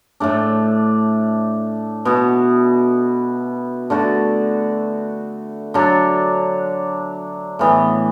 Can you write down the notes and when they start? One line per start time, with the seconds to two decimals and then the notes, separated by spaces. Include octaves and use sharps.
0.20 A2 A3 D4
2.05 B2 B3 F#4
3.90 D3 A3 F#4
5.74 D3 F#3 D4
7.59 A2 E3 B3